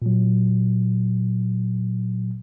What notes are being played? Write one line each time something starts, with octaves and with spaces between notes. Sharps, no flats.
A#2 F#3